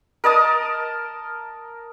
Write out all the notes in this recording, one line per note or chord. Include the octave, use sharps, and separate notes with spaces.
A#4 D#5 A5 D#6